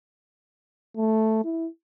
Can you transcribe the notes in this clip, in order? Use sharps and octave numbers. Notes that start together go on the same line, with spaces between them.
A3
E4